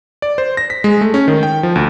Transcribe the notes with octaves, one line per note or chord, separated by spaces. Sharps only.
D5
C5
A#6
B6
G#3
A3
C#4
D#3
G5
F3
D2